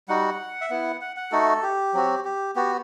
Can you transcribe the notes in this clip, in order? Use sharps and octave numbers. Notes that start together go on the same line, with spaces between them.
G3 D#4 F#4 F#5
E5
B3 E4 F#5
F#5
F#5
A3 D#4 F#4 A4
G4
F#3 C4 F#4
G4
B3 F#4 G4